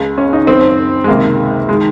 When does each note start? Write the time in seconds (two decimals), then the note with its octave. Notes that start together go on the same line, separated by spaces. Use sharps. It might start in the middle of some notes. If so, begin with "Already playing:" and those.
Already playing: C#2 C#3
0.18 C#4
0.33 D#4
0.47 F#2 D#3 C4
1.04 G#3
1.08 C#2 C3 D#3 A#3
1.69 G#3
1.72 D#3